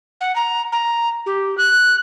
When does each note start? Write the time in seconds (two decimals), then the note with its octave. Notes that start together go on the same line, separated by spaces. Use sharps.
0.21 F#5
0.36 A#5
0.72 A#5
1.26 G4
1.58 F#6